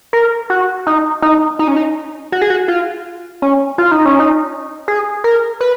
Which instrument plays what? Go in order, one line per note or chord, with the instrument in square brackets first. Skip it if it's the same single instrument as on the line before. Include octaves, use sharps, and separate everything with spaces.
[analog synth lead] A#4
F#4
D#4
D#4
D#4
C#4
D#4
F#4
G#4
F#4
F4
C#4
F4
D#4
C#4
D#4
G#4
A#4
B4